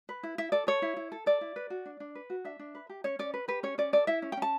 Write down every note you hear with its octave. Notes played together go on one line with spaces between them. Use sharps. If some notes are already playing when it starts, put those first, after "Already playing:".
B4
E4
E4 E5
A4 D5
A4 C#5
E4
E4
A4
A4 D5
E4
B4
F#4
D4
D4
B4
F#4
D4 E5
D4
B4
G4
C#4 C#5
C#4 D5
B4
G4 B4
C#4 C#5
C#4 D5
A4 D5
E4 E5
C#4
G5
C#4 A5